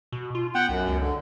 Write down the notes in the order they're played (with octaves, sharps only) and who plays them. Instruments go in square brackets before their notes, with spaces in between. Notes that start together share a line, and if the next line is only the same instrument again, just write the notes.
[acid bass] B2
F4
[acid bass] B3 [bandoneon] F#5 G5
[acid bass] B1 [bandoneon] F#2
[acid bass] C#2
[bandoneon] D3